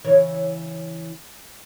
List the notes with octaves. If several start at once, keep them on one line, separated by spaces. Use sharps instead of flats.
C#3 E3 C#5